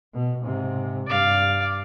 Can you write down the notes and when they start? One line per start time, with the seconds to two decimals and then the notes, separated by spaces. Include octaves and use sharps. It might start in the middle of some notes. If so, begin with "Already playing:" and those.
0.14 B2
0.43 G#2 C3
1.07 G2 D5 F5